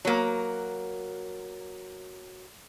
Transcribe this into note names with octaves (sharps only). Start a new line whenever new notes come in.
F#3 A#3